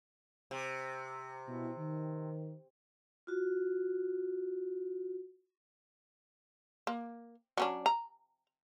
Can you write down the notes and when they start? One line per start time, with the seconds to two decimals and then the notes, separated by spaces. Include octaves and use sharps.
0.51 C3
1.48 B2 E4
1.78 D#3
3.27 F4 F#4
6.87 A#3
7.57 F#3 C#4 D4
7.86 A#5